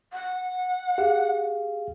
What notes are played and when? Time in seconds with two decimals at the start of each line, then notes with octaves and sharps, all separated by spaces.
0.13 F#5
0.98 G4 G#4 F5